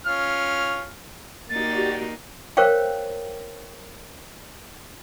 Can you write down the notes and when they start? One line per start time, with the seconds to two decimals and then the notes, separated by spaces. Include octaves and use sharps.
0.06 C#4 F4 F6
1.50 A#3 D#4 F#4 G4 D5 A6
2.57 A#4 C5 C#5 F5 G5